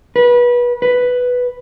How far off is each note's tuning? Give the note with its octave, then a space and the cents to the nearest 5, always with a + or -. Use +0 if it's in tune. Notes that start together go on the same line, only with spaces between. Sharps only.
B4 -25
B4 +0